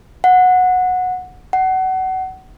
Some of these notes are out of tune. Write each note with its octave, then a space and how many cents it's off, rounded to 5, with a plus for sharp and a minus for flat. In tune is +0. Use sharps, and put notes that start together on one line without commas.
F#5 -15
F#5 +25